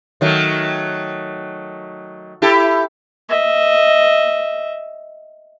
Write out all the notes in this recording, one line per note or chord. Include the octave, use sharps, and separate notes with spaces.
D#3 F#3 A3
E4 G4 A4
D#5 E5